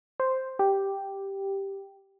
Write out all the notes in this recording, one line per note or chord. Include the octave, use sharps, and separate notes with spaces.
C5
G4